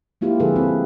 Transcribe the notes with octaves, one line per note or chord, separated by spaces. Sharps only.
G#3 A#3 E4 F4 G4
D3 F3 G#4 A4 B4
C4 F4